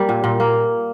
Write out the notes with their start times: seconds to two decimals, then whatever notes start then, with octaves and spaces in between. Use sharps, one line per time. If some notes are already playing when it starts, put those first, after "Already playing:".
Already playing: G3 A#3
0.09 A#2
0.24 A#2
0.40 A#3